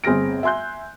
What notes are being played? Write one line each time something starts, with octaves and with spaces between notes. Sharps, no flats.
G1 C4 G#4 F6 A#6 D7
E5 G#5 C6 F#6 G6